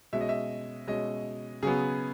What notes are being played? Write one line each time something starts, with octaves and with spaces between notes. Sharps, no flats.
B2 G#3 C#4 E5
D#5
E5
B2 G#3 C#4 D#5
C#3 F#3 B3 G#4